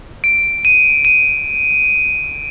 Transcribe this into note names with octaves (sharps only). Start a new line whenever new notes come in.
D7
D#7
D#7